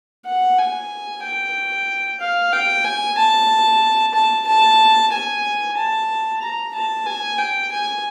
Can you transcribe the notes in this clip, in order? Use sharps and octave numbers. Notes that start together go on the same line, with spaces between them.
F#5
G#5
G5
F5
G5
G#5
A5
A5
A5
G#5
A5
A#5
A5
G#5
G5
G#5